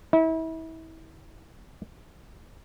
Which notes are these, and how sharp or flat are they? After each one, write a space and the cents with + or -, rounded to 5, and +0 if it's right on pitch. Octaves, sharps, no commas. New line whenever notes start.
E4 -35